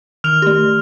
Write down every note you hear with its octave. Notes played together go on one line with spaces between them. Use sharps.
D#3 F6 F7
A3 G4